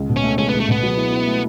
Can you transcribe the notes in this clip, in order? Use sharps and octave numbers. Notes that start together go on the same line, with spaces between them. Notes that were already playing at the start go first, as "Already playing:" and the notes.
Already playing: C#2
B2
C#4
A3
C#2 C#4
B3
C#2
A3
B2 B3
F#3
E4
E4
A3